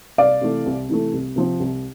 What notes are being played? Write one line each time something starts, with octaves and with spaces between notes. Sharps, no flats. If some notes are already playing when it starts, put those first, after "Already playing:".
C2 D5 F5
C3 E3 A3
C2
C3 E3 A3
C2
C3 F3 C4
C2